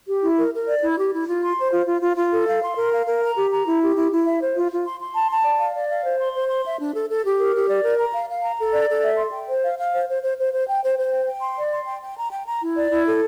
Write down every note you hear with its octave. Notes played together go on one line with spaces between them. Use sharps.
G4
E4
A#4
A#4
D5
E4
G4
E4
F4
C6
C5
F4
F4
F4
F4
A4
F5
C6
A#4
F5
A#4
A#5
G4
A#5
E4
G4
E4
E4
E5
C5
F4
F4
C6
C6
A5
A5
D5
F5
D5
F5
C5
C6
C5
C6
E5
D4
A4
A4
G4
A#4
G4
D5
A#4
A#5
F5
F5
A#5
A4
D5
A4
E5
C6
G5
C5
F5
F5
C5
C5
C5
C5
C5
G5
C5
C5
G5
G5
C6
D5
C6
G5
G5
A#5
G5
A#5
E4
D5
E4
A4